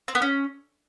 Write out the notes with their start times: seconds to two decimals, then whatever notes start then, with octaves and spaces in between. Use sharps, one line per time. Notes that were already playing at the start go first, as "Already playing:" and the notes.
0.08 C4
0.15 B3
0.22 C#4